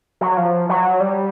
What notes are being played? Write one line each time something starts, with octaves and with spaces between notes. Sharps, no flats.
F#3
F3
F#3
G3